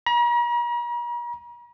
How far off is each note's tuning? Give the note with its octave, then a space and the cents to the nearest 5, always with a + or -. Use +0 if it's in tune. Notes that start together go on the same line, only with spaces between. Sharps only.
A#5 +45